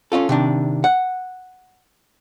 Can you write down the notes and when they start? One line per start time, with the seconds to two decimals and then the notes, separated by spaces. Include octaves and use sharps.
0.12 C#4 D#4 F4 A4
0.29 C3 D#3 D4
0.84 F#5